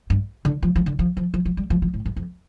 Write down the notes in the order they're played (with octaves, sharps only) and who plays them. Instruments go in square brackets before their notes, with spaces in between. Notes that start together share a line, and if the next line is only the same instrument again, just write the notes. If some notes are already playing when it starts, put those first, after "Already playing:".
[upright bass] G2
D3
F3
F3
D3
F3
F3
F3
F3
G3
F3
F3
A2
G2
F2